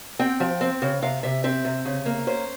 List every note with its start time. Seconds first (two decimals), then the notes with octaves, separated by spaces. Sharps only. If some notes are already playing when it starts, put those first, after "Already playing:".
0.19 C4 G5
0.40 F3
0.61 C4
0.82 C#3
1.02 C3 F5
1.23 C3 E5
1.44 C4 E5
1.65 C3
1.85 C#3
2.06 A#3
2.27 C#4 C5